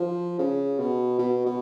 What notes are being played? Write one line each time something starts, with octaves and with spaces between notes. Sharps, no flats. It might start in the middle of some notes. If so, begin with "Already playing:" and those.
Already playing: F3
C#3
B2
B2
B2